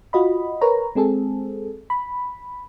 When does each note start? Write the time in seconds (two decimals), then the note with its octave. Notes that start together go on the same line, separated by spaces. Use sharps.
0.13 F4 F#4 D#5 B5
0.61 A#4 B4 C#5 A#5
0.95 G#3 C4 G#4 A4
1.90 B5